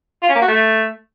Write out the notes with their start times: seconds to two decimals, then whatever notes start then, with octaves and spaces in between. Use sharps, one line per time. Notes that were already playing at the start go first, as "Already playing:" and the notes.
0.22 F4
0.29 C#4
0.35 A#3
0.42 F#4
0.48 A3